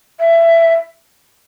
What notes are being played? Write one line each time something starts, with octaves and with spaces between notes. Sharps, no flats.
E5